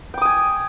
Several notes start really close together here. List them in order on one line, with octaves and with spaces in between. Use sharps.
G5 D6 D#6 G#5